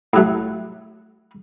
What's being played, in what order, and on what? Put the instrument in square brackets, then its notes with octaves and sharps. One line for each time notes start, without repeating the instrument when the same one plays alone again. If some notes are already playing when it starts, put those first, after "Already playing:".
[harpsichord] A2 F#3 A3